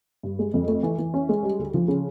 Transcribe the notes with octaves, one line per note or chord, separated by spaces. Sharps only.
G2
G#3
F2
A3
E3
E3
C#4
G#3
G3
D2
F3
C#3